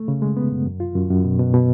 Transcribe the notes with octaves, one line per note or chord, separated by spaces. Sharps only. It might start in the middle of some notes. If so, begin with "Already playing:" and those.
Already playing: A3
C#3
G#3
B3
F#2
F#2
F4
F#2
F#2
B2
B2
B2